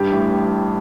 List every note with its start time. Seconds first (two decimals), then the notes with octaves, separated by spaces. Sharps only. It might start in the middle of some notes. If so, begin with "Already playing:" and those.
Already playing: G2 G4
0.12 A1